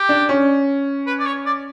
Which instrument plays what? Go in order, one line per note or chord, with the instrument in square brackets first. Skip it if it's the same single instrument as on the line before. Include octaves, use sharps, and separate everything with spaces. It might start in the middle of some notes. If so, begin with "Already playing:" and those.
Already playing: [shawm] G4
[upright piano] D4
C#4
[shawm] B4
D5
C#5
D5